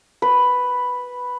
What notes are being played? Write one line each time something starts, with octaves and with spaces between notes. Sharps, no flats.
B4